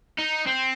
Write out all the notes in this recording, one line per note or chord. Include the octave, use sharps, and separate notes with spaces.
D#4
C4